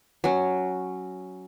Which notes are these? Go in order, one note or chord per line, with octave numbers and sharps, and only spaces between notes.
F#3 C#4